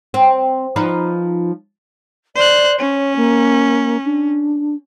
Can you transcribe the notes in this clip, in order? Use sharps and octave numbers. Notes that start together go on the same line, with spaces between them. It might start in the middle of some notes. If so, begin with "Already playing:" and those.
C4
F3 D#4 B4
C5 D5 F#6
C#4 C#5
A#3
D4